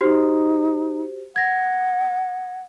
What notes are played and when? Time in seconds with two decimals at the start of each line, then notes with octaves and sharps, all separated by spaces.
0.01 D#4 F#4 G4 C5
1.36 F#5 G#6 A#6